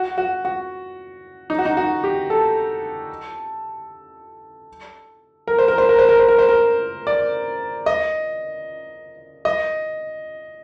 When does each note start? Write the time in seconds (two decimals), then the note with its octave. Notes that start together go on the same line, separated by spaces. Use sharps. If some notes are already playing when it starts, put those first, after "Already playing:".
Already playing: F#4
0.18 F#4
0.45 F#4
1.50 D#4
1.59 F#4
1.65 D#4
1.77 F#4
2.04 G4
2.30 A4
5.48 A#4
5.59 C5
5.68 A#4
5.78 C5
5.89 A#4
5.99 C5
6.09 A#4
6.19 C5
6.28 A#4
6.39 C5
6.49 A#4
7.07 D5
7.86 D#5
9.45 D#5